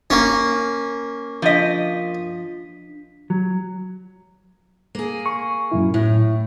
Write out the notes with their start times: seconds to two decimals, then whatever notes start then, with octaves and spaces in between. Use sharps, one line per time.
0.10 A#3 C#4
1.42 F3 D4 D#5 B6
3.30 F#3
4.95 A#3 G#4
5.26 C#6
5.72 F#2 A#2 E4
5.94 A2 E4